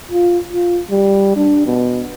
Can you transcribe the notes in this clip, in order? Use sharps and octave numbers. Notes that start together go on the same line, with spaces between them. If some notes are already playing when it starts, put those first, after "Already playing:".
F4
F4
G3
D4
B2